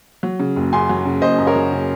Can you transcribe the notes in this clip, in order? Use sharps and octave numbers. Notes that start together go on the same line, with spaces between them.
F#3
C#3
F#1
F#2 G#5 C6
F#3
C#3
F#1 C5 D#5
F#2
A#4 C#5
F#3
C#3